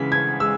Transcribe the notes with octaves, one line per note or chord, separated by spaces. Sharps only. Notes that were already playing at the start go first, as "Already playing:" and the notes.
Already playing: C#3 E3 G#3 B6
G#6
G#3 E6